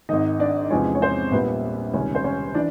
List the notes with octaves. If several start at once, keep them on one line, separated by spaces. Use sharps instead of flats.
G#1 G#2 D#3 D#4 D#5
D4 D5
E2 C3 F3 G#3 C#4 C#5
C#5
C4 C5
A#1 A#2 G3 B3 B4
C#2 C3 D#3 G3 C#4 C#5
C5
C#4 C#5
E3 D4 D5